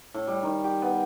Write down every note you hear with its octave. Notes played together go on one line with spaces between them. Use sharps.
A2
G3
D#3
G4
B3